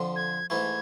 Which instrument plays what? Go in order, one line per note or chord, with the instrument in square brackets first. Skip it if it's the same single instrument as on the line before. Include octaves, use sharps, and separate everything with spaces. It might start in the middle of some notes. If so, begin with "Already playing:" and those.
Already playing: [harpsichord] F2 D3 F3
[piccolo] G#6
[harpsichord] G#2 E3 A3 [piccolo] G#6